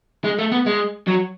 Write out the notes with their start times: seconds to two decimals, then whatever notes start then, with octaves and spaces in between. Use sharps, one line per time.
0.24 G#3
0.38 A3
0.52 B3
0.66 G#3
1.08 F#3